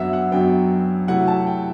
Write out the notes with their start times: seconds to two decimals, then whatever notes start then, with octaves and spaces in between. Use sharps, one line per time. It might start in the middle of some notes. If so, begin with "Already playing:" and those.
Already playing: F#2 F#3 B3 D4 E5 F#5
0.13 F#5
0.32 F#2 F#3 B3 D4 G5
1.08 C3 F#3 A3 E4 F#5
1.28 A5
1.47 G5